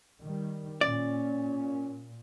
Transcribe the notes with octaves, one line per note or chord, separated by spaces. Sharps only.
D#3 G3
A#2 C#4 D5